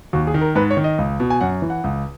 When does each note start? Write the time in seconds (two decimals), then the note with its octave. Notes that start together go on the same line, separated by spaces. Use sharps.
0.13 D#2 F#4
0.27 G#4
0.34 D#3
0.41 A#4
0.55 G#2 B4
0.70 C#5
0.77 D#3
0.84 D#5
0.98 C#2
1.20 B2
1.30 G#5
1.41 F#2 F#5
1.62 E3
1.70 F#5
1.84 C#2